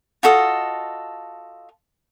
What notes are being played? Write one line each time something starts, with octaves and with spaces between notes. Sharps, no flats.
F4 F#4 A4 D#5